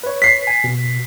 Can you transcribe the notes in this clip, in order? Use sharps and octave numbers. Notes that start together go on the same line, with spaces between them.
B4 C#5
B6 C7
G#5
B2